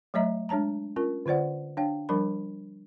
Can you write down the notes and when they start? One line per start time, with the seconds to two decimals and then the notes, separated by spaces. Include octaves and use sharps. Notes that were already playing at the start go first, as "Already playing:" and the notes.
0.14 F#3 A3 C#5 D#5 E5 A#5
0.49 G#3 D4 C#5 A5 A#5
0.96 C#4 F4 A#4
1.26 D3 F4 C5 D5 F#5
1.77 D4 C#5 F5 G5
2.09 F3 G3 D4 A#4 B5